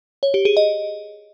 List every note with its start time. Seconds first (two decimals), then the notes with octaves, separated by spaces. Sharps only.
0.23 C#5
0.34 G4
0.45 G#4
0.57 D#5